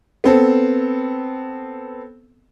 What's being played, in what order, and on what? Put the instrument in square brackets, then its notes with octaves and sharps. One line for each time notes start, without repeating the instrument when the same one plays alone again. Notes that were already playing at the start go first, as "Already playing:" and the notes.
[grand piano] B3 C4 A4